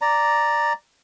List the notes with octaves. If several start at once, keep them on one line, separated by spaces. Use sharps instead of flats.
D5 A#5